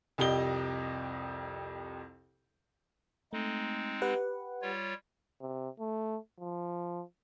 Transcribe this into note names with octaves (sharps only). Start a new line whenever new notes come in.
C2 F2 G4 D#5 G7
G#3 A3 C4 D#4
G4 B4 F#5
G3 F4 C#5
C3
A3
F3